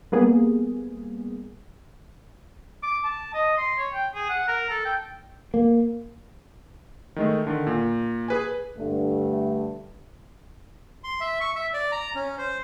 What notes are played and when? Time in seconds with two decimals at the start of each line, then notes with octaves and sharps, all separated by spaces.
0.12 G3 A#3 B3 G#4
2.83 D6
3.04 A5
3.34 D#5
3.58 C6
3.78 C#5
3.93 G5
4.15 G#4
4.29 F#5
4.48 A#4
4.70 A4
4.85 G5
5.54 A#3
7.16 D#3 G#3 A3
7.47 D3 D#3
7.67 A#2
8.28 G#4 B4 G#5
8.77 G2 D3 A3
11.04 C6
11.20 E5
11.41 C#6
11.56 E5
11.74 D5
11.92 A#5
12.15 C#4
12.38 C5